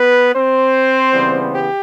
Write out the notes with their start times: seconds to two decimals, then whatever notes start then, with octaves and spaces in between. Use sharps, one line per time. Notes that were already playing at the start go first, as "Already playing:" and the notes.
Already playing: B3 B4
0.34 C4 C5
1.12 C#3 E3 G3 B3
1.53 G4